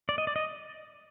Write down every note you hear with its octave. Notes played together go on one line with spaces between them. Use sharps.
D5
D#5
D5
D#5